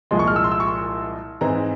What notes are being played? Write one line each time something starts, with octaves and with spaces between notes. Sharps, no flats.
C2 A#2 F3 G#3 C6
C#6
F6
E6
C6
E6
C#6
C6
G#2 E3 G#3 C4 A#5